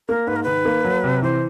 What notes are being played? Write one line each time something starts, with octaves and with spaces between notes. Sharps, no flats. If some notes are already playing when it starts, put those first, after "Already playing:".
A#3 A#4
G#2 B4
A#4
D#3 B4
A#3
F#3
C3
E3 C5